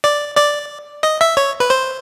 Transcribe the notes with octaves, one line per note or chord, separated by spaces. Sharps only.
D5
D5
D#5
E5
C#5
B4
C5